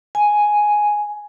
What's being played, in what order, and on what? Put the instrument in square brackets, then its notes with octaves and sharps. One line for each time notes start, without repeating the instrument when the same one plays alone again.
[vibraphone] G#5